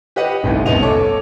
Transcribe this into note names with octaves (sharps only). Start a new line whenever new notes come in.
G4 B4 D#5 F#5
G1 C2 A2 D#4
E1 C2 B3 C#4 D#5 F7
A4 C#5 D6